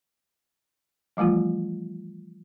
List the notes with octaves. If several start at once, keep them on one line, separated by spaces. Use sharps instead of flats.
E3 F3 G3 A3 F4